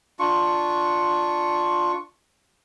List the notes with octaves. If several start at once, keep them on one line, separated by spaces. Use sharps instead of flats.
D4 F4 C#6